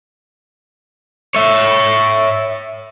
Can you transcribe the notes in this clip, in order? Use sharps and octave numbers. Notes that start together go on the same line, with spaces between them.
C#5 E5